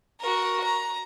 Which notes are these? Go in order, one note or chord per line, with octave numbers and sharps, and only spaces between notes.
F#4 A#4
A#5